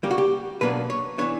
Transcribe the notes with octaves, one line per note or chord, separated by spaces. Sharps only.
C#3 G3 A#3 G4
F#4
G4
B2 F#3 A#3 D4 B4
C#5
E3 B3 D4 C#5